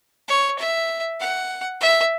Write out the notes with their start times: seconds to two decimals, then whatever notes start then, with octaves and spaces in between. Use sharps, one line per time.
0.28 C#5
0.59 E5
1.20 F#5
1.81 E5